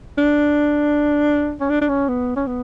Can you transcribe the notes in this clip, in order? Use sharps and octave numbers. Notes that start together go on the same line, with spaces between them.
D4
C#4
D4
D4
C#4
B3
C#4
B3